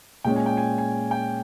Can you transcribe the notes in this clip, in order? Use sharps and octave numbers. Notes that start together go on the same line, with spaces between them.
A#2 G#3 C#4 G5
G#5
G5
G#5
G#5
G5